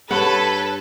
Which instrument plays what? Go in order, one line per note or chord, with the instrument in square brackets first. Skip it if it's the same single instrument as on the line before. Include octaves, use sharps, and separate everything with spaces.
[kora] G2 F#5 [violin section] A4 [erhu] B4 [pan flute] C#5